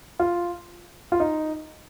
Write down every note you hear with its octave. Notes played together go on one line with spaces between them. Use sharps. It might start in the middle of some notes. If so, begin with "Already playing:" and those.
F4
F4
D#4